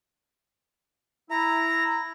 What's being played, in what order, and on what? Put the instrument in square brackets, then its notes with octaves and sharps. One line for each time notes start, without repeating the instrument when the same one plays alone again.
[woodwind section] E4 [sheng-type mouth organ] A#5